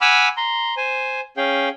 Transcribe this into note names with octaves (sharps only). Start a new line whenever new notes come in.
F#5 G#5 B5 D6 E6 F6
A#5 C6
C5 G#5
C#4 G#4 F5 G5